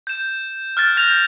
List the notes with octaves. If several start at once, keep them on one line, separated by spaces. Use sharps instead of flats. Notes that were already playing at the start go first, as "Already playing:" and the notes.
G6 E7
F6 F#6 A6
F6 G6 A#6 F7